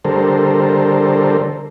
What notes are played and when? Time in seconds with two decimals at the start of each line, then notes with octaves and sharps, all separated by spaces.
0.05 D3 G3 A4 A#4 C5